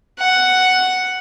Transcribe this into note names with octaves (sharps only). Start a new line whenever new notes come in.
F#5